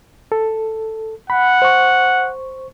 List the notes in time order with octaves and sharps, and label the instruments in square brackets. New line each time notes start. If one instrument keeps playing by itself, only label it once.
[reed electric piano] A4
[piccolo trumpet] F#5 [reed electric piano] B5
[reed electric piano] C5 C#6